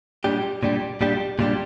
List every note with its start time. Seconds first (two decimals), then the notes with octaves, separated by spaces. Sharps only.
0.24 A#2 G3 D4 G4
0.63 A#2 G3 D4 G4
1.01 A#2 G3 D4 G4
1.39 A#2 G3 D4 G4